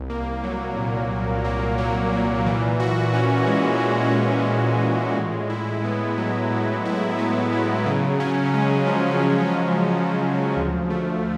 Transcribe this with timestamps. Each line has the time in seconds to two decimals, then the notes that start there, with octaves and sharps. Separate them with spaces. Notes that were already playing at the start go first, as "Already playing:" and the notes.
Already playing: C2
0.10 A#3
0.44 F#3
0.77 A#2
1.11 C2
1.45 A#3
1.78 F#3
2.12 A#2
2.46 E3
2.80 F#4
3.13 C#4
3.47 G#3
3.81 E3
4.15 F#4
4.48 C#4
4.82 G#3
5.16 A2
5.50 E4
5.84 B3
6.18 F#3
6.51 A2
6.85 E4
7.19 B3
7.52 F#3
7.86 C#3
8.20 C#4
8.54 G#3
8.87 F3
9.22 C#3
9.55 C#4
9.89 G#3
10.23 F3
10.56 D2
10.90 A3